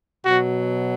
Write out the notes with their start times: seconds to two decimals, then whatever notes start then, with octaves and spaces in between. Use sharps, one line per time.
0.25 B2 F#3 F#4